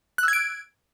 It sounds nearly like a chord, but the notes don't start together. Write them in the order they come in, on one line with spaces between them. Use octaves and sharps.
F#6 E6 G#6 D7